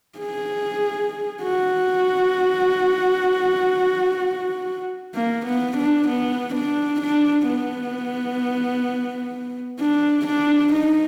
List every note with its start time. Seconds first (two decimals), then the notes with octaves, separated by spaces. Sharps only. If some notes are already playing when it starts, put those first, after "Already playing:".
0.19 G#4
1.43 F#4
5.15 A#3
5.46 B3
5.77 D4
6.08 B3
6.55 D4
7.01 D4
7.48 B3
9.80 D4
10.27 D4
10.73 D#4